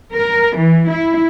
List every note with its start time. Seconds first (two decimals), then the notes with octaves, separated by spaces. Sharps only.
0.14 A#4
0.57 E3
0.91 E4